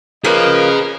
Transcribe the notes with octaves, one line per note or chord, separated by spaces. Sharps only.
F3 A#3 G#4 A#4 B4 C#5 D#5